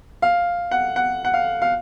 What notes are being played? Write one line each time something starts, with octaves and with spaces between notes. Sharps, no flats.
F5
F#5
F#5
F#5
F5
F5